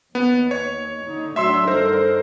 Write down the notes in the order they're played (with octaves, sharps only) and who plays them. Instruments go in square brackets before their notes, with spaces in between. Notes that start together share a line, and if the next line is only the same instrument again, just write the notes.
[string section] D#2 [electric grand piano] B3
[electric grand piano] C#5
[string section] D3 D#4
[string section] A2 F#3 D4 [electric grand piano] E5 C6 E6
[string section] G2 D3 D#3 [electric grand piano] A#4 C5